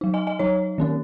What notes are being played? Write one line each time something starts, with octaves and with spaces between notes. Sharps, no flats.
F#3 D#4
D#5 G#5
D#5 G#5
F#3 D#4 C#5
D#3 A#3 C#4